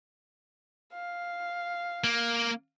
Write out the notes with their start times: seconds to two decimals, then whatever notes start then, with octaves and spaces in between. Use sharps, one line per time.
0.93 F5
2.04 A#3